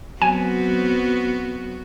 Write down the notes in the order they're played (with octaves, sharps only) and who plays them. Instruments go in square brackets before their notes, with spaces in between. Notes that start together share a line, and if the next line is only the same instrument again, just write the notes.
[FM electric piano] F#3 [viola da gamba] B3 F#4 [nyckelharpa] C4 [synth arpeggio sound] G#5